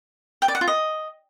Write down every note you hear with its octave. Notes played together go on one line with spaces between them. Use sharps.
G5
D5
F#5
F4
D#5